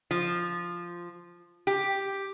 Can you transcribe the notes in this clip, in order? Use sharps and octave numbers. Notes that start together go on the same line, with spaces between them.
F3
G4